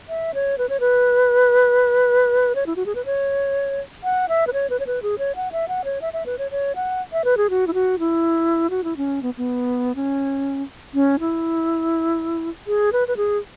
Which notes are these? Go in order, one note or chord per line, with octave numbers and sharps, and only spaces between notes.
E5
C#5
B4
C#5
B4
C#5
E4
F#4
G#4
B4
C#5
F#5
E5
B4
C#5
B4
C#5
B4
G#4
C#5
F#5
E5
F#5
C#5
E5
E5
B4
C#5
C#5
F#5
E5
B4
G#4
F#4
E4
F#4
E4
F#4
E4
C#4
B3
B3
C#4
C#4
E4
G#4
B4
B4
G#4